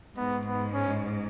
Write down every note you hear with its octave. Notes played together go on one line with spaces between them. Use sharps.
G#2 B3
B3
C#4